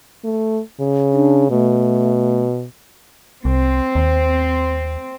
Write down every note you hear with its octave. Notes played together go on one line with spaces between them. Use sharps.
A3
C#3
D4
B2 A3
C2 C4
D#2